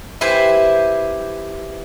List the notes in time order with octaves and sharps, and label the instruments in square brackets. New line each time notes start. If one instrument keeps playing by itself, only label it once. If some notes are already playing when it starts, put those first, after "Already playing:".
[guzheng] E4 G4 B4 C5 E5 G#5